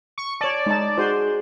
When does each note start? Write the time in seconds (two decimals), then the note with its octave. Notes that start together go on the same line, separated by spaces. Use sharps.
0.18 C#6
0.41 C#5 D5 A5
0.66 G#3 D#4 A5
0.97 D#4 F#4 G#4 C5 C6